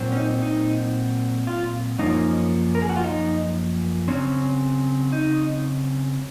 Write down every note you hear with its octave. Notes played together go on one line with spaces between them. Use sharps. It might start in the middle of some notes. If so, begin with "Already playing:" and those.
Already playing: A#2 F#3 C4
C#4
D#4
D#4
F4
F#2 F3 A#3 C#4 D#4
A#4
G#4
F#4
F4
D#4
C#3 F#3 C4 C#4
D#4